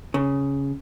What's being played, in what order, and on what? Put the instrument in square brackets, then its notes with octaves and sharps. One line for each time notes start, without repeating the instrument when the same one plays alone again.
[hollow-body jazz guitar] C#3